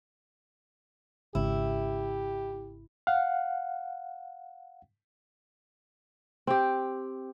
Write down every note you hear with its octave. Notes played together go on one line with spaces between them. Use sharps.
G#1 C#3 E4 G4
F5 F#5
C4 G4